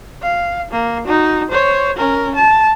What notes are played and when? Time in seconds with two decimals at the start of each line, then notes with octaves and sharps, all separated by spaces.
0.23 F5
0.72 A#3
1.05 D#4 F#4
1.50 C5 C#5
1.97 C#4 A#4
2.35 A5